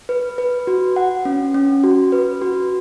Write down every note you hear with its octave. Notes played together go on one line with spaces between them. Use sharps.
B4
B4
F#4
F#5
C#4
C#4
F#4
B4
F#4